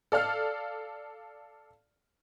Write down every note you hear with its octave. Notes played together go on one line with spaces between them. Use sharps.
A4 D5 F5 F6